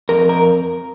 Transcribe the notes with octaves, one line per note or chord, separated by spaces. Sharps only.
F2 A#4
A#4